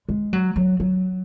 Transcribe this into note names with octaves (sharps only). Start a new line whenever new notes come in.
G#3
F#3
F#3
F#3